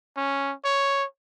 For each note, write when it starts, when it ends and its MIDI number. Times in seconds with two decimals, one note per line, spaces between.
0.16 0.54 61
0.64 1.05 73